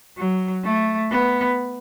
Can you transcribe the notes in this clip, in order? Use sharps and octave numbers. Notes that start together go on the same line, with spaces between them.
F#3
A3
B3